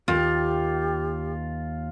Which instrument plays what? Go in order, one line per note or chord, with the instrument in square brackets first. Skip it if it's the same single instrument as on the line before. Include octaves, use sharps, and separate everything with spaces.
[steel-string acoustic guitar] D#2 [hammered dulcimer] F4 [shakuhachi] G4